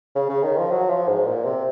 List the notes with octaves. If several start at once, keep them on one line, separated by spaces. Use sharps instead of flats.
C#3
C#3
D#3
F3
F#3
F3
G#2
A#2
C3